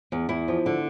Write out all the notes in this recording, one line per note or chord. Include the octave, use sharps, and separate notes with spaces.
E2
E2 E4
F3
D3